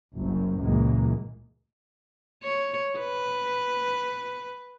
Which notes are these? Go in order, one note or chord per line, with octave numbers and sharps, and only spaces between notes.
F#1 C2 F#2
C#2 F#2 A#2 E3 G#3 A#3
C#5
B4